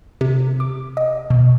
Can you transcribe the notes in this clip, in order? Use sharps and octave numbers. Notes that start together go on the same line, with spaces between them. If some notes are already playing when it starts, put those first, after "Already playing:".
C3
D6
D#5
B2